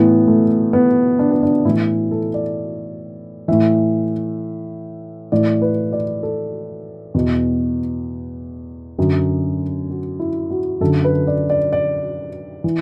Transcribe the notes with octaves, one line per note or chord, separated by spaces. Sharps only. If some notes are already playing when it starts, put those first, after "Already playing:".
Already playing: A2 E3 B3
A3
B3
D4
B3
D4
A2 E3 E4
A4
D5
A2 E3 E5
A2 E3 D5
B4
D5
A4
E2 B2
F#2 D3
F#4
E4
F#4
F#2 D3 A4
B4
D5
D5
D5
E3